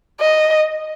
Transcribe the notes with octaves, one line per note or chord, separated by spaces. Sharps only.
D#5